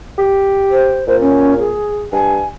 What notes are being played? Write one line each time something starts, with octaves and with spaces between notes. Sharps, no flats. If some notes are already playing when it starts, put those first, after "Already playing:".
G4
C5
A#2 C5
C#4
G#4
G2 G#5